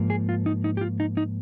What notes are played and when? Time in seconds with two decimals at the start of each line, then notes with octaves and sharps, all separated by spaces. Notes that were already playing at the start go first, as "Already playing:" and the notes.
Already playing: G#2 F3 A#3
0.10 G#4
0.29 F4
0.46 D#4
0.64 D#4
0.77 G4
0.81 F4
1.00 D#4
1.17 D#4